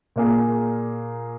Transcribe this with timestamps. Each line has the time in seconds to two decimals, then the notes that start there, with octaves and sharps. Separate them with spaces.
0.16 A#2 A#3 G#4